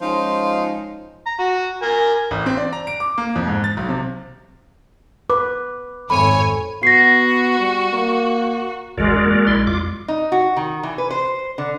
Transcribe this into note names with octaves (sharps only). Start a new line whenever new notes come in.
F3 G#3 C#4 D#4 F4
A#5
F#4
A#4 G#5
A1
C4
D5
A#5
D7
D6
A#3
F2
G#2
A6
B1
C3
B4 D6
G#1 F2 A2 C#5 G#5 B5
B3 F#4 A#6 C7
G3
A#3
D1 G1 E3 G#3 F#4 A#4 D5
F2 D4
A#3
A#1 E4 D5 C6
F2 G#3 F4 D6
D#4
F#4
D#3
E3
B4
C5
D3